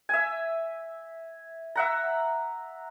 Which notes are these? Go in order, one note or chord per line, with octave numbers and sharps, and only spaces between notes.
E5 G#5
E5 F#5 A#5